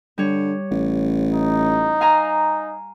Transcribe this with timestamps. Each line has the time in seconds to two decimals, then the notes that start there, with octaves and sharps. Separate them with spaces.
0.18 D3 G3 C#5
0.71 A1
1.35 D#4
2.01 F5 G#5 A#5